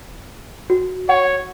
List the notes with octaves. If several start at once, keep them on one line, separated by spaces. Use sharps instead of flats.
F#4
C#5 F#5